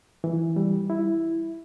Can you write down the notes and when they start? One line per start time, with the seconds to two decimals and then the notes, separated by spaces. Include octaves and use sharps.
0.24 E3
0.56 G3
0.90 E4